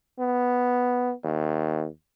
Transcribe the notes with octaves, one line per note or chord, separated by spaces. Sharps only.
B3
D#2